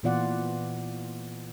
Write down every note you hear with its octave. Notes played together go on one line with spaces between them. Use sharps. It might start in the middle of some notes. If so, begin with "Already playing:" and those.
A#2 E3 B3 F4 D5 F#5